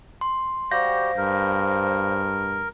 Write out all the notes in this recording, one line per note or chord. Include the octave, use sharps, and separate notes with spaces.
C6
G3 F#4 G4 C5 F5 G6 A#6
G2 A#4